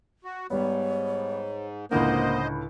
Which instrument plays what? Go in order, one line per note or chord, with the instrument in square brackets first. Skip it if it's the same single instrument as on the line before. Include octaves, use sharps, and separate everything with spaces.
[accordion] F#4
[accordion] G#2 [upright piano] G3 B3 [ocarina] C#5
[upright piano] C#2 A2 D3 [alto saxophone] A#3 [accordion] C5 D#5 [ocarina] F#5